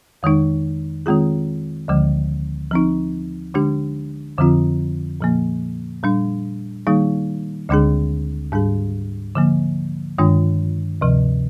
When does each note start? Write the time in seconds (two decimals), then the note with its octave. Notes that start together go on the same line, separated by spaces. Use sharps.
0.23 F2 D#3 G#3 D#4
1.06 D#3 G#3 C4 F4 G#4
1.88 D2 D3 F3 G#3
2.71 F3 C4 D#4
3.54 D3 G#3 D4 G4
4.38 F2 D3 F3 C4 F4
5.21 A#2 F3 A#3
6.03 A#2 G3 D4
6.87 D#3 G3 A#3 D#4 G#4
7.69 D2 D3 G#3 D4 G#4
8.52 G#2 G3 D4 G#4
9.35 D3 F3 A#3
10.18 G2 D#3 G#3 D4 F4
11.01 D2 C3 F3